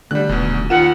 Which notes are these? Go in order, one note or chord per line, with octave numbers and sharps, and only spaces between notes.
D2 D3 G3 F#6
D#1 E2 B2
D#2 F4 A#4 F#5 E7